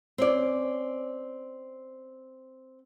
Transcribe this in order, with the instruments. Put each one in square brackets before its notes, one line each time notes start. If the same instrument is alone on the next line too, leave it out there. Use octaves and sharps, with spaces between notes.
[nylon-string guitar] C4 C#4 D5